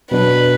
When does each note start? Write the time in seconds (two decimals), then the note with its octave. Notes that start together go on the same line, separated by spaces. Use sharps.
0.12 B2 F#3 D4 B4